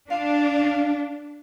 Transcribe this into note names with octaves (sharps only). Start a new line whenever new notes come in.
D4 F5